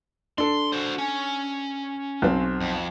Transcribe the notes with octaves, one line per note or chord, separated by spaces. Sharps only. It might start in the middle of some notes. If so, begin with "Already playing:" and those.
D4 A4 C6
F#4 C5
C#4
B1 C4
F2